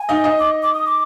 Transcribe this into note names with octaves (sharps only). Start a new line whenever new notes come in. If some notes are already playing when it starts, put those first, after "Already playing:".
Already playing: G#5
D#4 D#5
D#4 D#5
D6
D6
D#6
D6